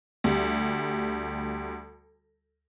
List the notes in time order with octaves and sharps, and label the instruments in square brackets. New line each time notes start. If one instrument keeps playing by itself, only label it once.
[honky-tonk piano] D2 G3